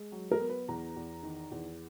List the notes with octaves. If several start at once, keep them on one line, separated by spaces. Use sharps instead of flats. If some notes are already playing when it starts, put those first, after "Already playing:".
Already playing: G#3
F#3
A#4
B3
B4
E2 A#5
E2
D#3
E2